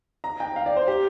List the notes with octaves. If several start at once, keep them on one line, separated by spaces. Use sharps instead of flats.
A#5
G5
F5
D5
C5
G4